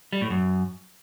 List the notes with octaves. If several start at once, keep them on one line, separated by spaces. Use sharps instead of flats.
G3
A2
F#2